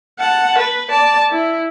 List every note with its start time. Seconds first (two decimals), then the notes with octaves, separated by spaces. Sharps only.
0.19 F#5 A5
0.58 B4
0.90 D5 A5
1.31 E4